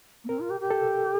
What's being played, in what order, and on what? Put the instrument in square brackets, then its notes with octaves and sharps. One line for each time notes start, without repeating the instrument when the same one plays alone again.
[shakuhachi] A#3
[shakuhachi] C4 [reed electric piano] A#4
[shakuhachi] F4
G4
G4
[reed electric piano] A4